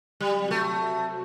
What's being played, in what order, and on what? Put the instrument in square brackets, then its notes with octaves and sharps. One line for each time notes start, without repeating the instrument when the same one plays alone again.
[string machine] C3 F#3 C4 F#4 [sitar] G3
[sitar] A3